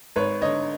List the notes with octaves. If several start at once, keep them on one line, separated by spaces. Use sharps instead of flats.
G#1 B4 C#5
D3 C#5 D#5